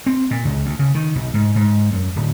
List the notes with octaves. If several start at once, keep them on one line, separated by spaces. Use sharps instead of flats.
C4
A#2
C#2
D2
C#3
D#3
B1
G#2
G#2
F#2
D1